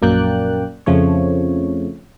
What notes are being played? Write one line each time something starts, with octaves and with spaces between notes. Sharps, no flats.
A#1 F#2 A#3 D5 G5 F#6
F2 C#3 F3 A3 C#5